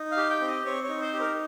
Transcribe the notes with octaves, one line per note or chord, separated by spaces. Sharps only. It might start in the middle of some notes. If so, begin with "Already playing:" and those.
Already playing: D#4
F5
G4
G5
C4
D#5
C4 C#5
C#5
D#4
C5
G4
A#4